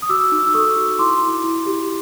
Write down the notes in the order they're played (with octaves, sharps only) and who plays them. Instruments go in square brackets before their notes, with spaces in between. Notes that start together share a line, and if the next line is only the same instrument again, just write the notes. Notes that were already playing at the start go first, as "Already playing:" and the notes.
[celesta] D#6
F#4 D6 E6
D#4
E6
A4 C#6 D#6
F#4
E4 C6 D6
E4
E4
G4